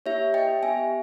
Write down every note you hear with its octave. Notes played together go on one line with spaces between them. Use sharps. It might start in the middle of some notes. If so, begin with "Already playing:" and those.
A#3 E4 G4 C#5 E5
D#5 G5
B3 G4 E5 G#5